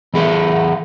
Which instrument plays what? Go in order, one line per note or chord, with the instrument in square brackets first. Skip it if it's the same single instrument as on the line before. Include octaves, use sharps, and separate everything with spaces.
[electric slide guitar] E3 G#4 A4